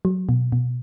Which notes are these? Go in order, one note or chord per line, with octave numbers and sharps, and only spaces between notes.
F#3
B2
B2